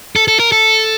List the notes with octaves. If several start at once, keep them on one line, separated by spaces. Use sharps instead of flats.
A4
A4
A#4
A4